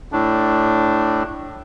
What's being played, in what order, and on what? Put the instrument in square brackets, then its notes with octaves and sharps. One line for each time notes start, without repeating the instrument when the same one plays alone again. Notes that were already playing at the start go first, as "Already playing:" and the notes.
[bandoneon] A2 D4